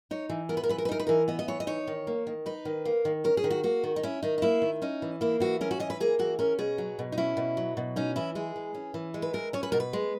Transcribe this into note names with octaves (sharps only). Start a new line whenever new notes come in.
D#4 C#5
E3
B3 A#4
B4
A#4
E3 B4
A#4
B4
D#4 A#4
B4
E3 A#4
B3 D#5
D#5
E3 C#5
D#5
D#4 C#5
D#3
A#3
D#3
D#4 B4
D#3
A#3
D#3
C#4 A#4
G#4
D#3
F#4
A#3 F#4
D#3
D#4
C#4 E4
D#3 D#4
D#4
A#3 E4
D#3
C#4 D#4
E3
A#3 E4
E3 F#4
C#4 A#4
F#4
E3 D#5
B4
A#3 G#4
E3 F#4
C#4 A#4
B2 G#4
F#3
B2
D#4
C#4 E4
B2
F#3
B2
C#4 D#4
E3 E4
G#3 G#4
E3
C#4
E3
G#3
B4
E3 A#4
C#4 C#5
B4
B2 A#4
B4
G#3